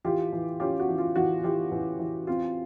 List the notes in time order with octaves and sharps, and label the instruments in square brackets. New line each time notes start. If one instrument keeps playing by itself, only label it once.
[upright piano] E3 F4 G4
E3
C#4 F4 G4
F#4
E3
F4
E3 F#4
E3 F4 G4
E3
E3
C4 F4